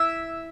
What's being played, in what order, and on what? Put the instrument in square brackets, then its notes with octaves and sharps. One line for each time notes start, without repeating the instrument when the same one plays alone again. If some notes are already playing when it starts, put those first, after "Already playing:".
Already playing: [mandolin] E4 E5